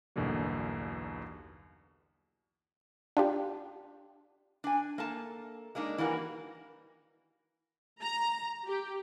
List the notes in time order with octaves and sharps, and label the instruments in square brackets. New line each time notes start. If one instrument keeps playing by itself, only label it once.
[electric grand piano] B1 E2 G2 B2 D3 A#3
[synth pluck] D4 F4 G4
[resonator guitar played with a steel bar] D4 G#5
A#3 A4 A5
G#3 A#3 D4 D#4
E3 G3 A#3 F#4
[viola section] A#5
G4